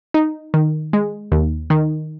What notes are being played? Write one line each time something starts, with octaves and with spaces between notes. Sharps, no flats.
D#4
D#3
G#3
D#2
D#3